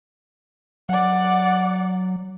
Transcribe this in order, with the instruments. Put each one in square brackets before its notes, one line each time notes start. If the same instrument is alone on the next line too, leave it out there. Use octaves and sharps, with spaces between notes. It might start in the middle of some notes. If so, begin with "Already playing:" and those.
[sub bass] F#3 [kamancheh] D5 F#5